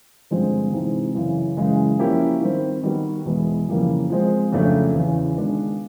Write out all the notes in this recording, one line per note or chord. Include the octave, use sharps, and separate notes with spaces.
G2 D3 F3 G#3 C4
C3 E3 G#3 C4 D#4
F#2 C#3 E3
F#2 C#3 E3 G#3
F3 A#3 C#4 E4 G4
D#3 G3 C4
D#3 G3 B3 D#4 F#4
E2 B2 G#3 B3 E4
F2 C#3 E3 G3 A#3
F3 G#3 C4
F2 C#3 F#3 A3 D4
E2 C#3 E3
D#3 G#3 B3 D4 F4